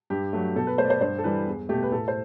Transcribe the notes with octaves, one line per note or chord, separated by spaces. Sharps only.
G2 G4
F#3 A3
B2 A4
B4
A3 C5
D5
C5
G2 C5
A4
E3 G3 B4
E2
B2 A3 G4
B4
A2 A4
C5